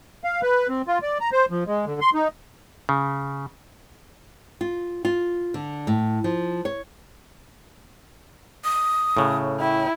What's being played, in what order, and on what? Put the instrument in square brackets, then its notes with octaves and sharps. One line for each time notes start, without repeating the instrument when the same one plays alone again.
[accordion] F5
B4
C4
F4
D5
A#5
C5
F3
G#3
D3
C6
D#4
[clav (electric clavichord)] C#3
[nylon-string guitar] F4
F4
D3
A2
F3
C#5
[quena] D#6
[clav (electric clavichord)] A2 C#3
[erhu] E4 [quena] G5